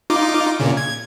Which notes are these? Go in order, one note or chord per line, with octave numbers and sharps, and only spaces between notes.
D#4 F4 D6
A#2 C#3
G#6